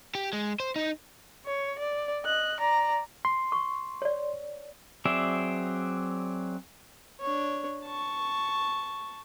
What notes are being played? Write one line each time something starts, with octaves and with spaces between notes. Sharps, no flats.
G4
G#3
C5
D#4
C#5
D5
D#5 F#6
D5 A#5
C6
C#6
C#5 D5
F#3 C4 G#4 D5 E5
D4 C#5
A5 C#6